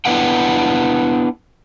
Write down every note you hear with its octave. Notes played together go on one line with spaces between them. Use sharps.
B3 D4 E4 B4 F#5 G5